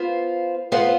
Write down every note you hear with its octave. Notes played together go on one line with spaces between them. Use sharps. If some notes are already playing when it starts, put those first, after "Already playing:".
Already playing: B3 F4 C5 F5
B3 F4 C5 F5